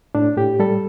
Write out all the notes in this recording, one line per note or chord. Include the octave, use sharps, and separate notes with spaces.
A2 D4
A2 G4
G3 A4